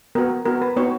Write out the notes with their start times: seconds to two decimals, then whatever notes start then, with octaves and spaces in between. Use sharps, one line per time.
0.15 B3 F#4 A#4
0.45 B3 F#4 A#4
0.62 B4
0.76 B3 D#4 F#4 C#5